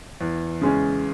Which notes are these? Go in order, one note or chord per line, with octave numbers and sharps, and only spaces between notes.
E2
C#3 G#3 C#4